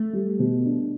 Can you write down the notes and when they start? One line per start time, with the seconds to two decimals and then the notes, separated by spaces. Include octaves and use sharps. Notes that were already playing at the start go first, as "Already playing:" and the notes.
Already playing: A3
0.13 G3
0.39 B2
0.65 D4